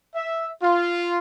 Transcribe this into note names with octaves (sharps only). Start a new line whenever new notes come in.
E5
F4